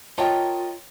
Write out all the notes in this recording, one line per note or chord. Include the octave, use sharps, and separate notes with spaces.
F4 A#4 C#5 D#5 G5 A5 A#5